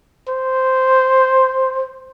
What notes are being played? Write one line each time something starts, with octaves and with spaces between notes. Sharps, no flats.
C5